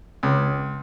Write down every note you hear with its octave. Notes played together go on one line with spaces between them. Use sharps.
C#2